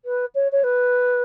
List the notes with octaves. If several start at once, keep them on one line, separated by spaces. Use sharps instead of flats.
B4
C#5
C#5
B4